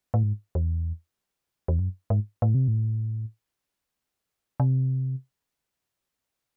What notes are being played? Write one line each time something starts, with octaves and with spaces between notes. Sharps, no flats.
A2
G#2
E2
E2
F#2
G#2
A2
C3
A2
C3